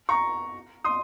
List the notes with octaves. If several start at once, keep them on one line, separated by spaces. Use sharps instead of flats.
A#5 C#6
C6 D#6